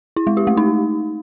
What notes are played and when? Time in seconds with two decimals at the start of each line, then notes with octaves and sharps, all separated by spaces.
0.16 E4
0.27 G#3
0.37 G4
0.47 A3
0.57 D#4